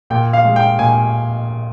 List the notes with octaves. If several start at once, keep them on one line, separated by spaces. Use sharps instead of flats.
A#2 G5
F5
G#3
G5
A#2 G#5